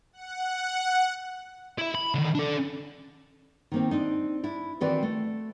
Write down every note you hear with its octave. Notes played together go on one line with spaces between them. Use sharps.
F#5
E4 E5
B5
D3 D#3
D4 A4
D#3 A#3 C4
C4 D4 D#4
D4 E4
D#3 E3 C4 F#4 B4 D5
A3